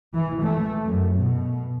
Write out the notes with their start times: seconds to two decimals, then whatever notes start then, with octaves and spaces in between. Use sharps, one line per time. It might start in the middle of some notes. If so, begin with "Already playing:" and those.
0.14 E3
0.43 A3
0.86 F#2
1.17 B2